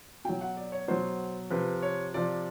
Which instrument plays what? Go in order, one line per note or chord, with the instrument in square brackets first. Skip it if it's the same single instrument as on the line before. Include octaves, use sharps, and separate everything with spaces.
[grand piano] B2 F#3 G5
F#5
D5
C#5
B2 F#3 C5
C3 F3 B4
C#5
C3 F3 D5